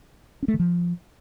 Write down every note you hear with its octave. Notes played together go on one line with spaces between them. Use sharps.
C#4
A3
D#3
F3